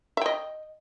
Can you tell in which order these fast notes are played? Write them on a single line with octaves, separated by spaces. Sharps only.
E5 G5 D#5